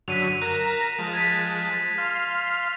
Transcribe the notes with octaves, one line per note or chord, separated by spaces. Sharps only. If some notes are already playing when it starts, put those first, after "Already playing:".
F#2 D3 F#3 B6 D#7 F7
A#4 A#5 F#6 A#6 E7
F3 G#3 A5 D#7
G#6 A6 B6
F5 C6 F6